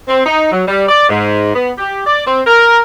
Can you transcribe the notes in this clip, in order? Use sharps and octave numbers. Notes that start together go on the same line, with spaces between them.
C4
D#4
F#3
G3
D5
G#2
B3
G4
D5
C4
A#4